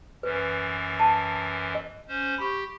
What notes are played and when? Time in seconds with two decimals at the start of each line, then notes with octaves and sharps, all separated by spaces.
0.23 F#2 E3 B4
0.99 A5
1.75 D#5
2.08 C#4 C5
2.38 G4 B5 C#6